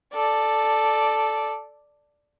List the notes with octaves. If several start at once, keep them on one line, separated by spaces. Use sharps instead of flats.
A4 D5